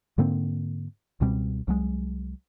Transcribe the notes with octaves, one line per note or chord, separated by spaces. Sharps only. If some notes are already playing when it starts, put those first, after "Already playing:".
G#2 D3 A#3 C4
C#2 B2 G3 C4
C2 F#3 G#3